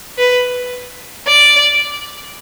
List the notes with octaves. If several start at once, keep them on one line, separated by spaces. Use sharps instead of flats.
B4
D5